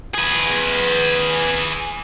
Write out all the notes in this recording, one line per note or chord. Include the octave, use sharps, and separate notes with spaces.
G#4 B4